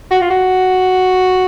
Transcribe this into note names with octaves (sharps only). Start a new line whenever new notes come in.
F#4
F4
F#4